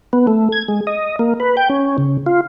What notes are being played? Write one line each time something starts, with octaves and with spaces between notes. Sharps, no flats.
B3
A3
G#6
G#3
D#5
A#3
B4
G5
C#4
C#3
F4